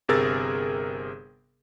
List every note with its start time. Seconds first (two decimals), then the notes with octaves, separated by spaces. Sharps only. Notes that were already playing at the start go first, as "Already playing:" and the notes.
0.08 G1 C3 G#4 A#4 E6 A6